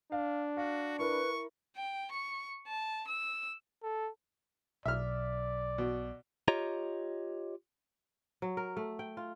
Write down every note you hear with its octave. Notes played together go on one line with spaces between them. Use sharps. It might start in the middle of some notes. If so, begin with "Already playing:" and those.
D4 F5
F#4 F5
E4 A#4 B4 C#6
G5
C#6
A5
E6
A4
B1 D5 E5 F6
B2
F4 G4 C#5 D#5 A#5
F#3
A#4
A3
G5
F4